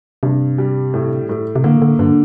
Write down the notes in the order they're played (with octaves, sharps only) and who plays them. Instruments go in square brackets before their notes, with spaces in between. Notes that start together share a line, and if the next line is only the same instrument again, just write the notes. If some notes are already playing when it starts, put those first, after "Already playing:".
[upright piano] G2 [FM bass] C3
[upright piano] G3
A2
A2
[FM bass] C3
[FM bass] D3 [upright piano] A#3
[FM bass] D3
[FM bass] G2 [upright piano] D3